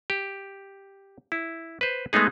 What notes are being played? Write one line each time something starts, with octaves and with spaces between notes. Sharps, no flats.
G4
E4
B4 C5
G#3 A3 B3 D#4 G#4